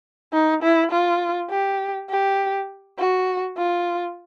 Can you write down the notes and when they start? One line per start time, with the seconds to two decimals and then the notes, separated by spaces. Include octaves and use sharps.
0.33 D#4
0.63 E4
0.91 F4
1.50 G4
2.10 G4
2.98 F#4
3.57 F4